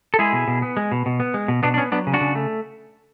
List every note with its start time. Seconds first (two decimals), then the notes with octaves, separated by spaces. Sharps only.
0.14 A4
0.19 G#3 E4 G#4
0.33 B2
0.48 B2
0.62 B3
0.77 G#3
0.92 B2
1.06 B2
1.20 B3
1.34 G#3
1.48 B2
1.63 B2 B3 D4
1.74 D4
1.78 B3 C#4
1.92 F#3 B3 D4
2.07 C#3
2.14 D4 F#4
2.21 C#3
2.35 A3